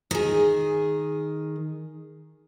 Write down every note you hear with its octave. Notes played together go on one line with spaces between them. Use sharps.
D#3 G#4